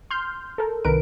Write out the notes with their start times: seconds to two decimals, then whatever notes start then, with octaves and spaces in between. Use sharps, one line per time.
0.11 C6 F6 G6
0.58 A4 A#4
0.85 C2 D#3 A#4 B4 D7